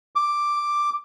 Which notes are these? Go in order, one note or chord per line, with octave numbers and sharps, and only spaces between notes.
D6